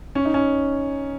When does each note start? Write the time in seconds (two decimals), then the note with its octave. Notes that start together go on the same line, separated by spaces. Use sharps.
0.15 C#4
0.25 D#4
0.34 C#4